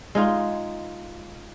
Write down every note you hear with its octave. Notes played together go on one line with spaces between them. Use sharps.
G#3 D#4 F4